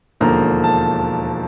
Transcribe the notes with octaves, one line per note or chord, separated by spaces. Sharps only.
E1 D#2 D3 F3 A#3 A#5
A5